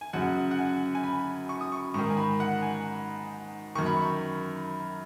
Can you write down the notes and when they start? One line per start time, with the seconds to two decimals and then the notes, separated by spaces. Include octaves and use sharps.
0.01 G#5
0.13 F#2 C#3 F#5
0.51 F#5
0.59 G#5
0.95 G#5
1.04 B5
1.49 C#6
1.61 D#6
1.72 C#6
1.94 G#2 D#3 C#6
2.10 G#5
2.17 B5
2.40 F#5
2.62 G#5
3.75 F#2 D#3 C#6
3.86 B5
3.97 C#6